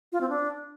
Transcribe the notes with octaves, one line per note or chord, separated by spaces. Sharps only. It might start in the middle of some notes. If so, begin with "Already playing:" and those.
F4
C4
D4